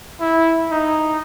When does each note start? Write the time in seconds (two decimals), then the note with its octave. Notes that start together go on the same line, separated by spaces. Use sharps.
0.21 E4
0.71 D#4